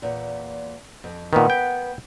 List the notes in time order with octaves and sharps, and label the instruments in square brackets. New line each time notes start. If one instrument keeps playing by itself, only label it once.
[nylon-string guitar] E2 A#2
F2
[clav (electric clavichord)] A#2 D#3 [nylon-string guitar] B3 A#4 B4
[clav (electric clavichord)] G5